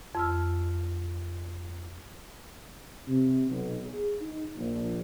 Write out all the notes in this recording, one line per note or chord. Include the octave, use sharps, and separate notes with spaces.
F2 E6 F6
C3
B1
G#4
D#4
A#1